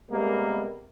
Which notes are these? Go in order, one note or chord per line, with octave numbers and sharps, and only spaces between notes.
C3 G3 G#3 A#3 B3 A#4